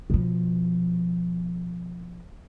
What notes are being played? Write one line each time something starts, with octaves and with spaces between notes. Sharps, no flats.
B2 F3